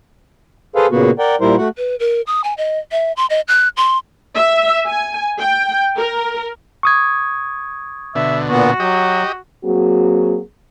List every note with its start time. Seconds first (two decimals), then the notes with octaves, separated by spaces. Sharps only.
0.76 G#4 A4 B4 C5 F5
0.91 A#2 C#3 A#3 B3 F#4
1.19 A#4 D5 F#5 G5
1.41 A#2 G3 E4 A#4 C5
1.57 A3 F#4 F#5
1.77 B4
2.00 A#4
2.27 D#6
2.44 G#5
2.58 D#5
2.92 E5
3.17 C6
3.30 D#5
3.48 F#6
3.77 C6
4.36 E5
4.87 G#5
5.40 G5
5.99 A#4
6.83 C#6 D#6 G#6
8.15 B2 D3 E5
8.50 A#2 B3 F#4
8.80 F#3 G4 D#5
9.64 F#3 A#3 C4 F#4 G#4